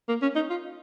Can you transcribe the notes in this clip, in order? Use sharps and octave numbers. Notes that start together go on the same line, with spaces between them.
A#3
C#4
D#4
F4